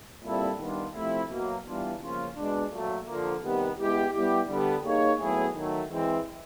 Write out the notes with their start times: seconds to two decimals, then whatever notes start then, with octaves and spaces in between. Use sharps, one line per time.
0.23 A#2 G3 C4 E4 A4
0.58 D#3 G3 B3 D4 F4
0.94 C3 F3 A3 C4 E4
1.29 B2 F#3 A#3
1.66 E3 G3 B3 D4 F4
2.01 C#3 F3 A#3 C#4 F4
2.36 B2 G#3 B3 D4
2.71 A#2 F#3 A3
3.06 D3 F3 A#3
3.42 C3 D#3 G3 B3
3.78 G#3 B3 E4 G4
4.12 G3 B3 E4 G4
4.48 D3 G3 B3
4.83 A#3 D#4 G#4 C#5
5.20 A2 F#3 B3 E4 G#4
5.54 D#3 F#3 A3
5.91 E3 G#3 C4